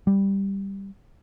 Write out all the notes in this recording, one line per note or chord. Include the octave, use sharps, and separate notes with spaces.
G3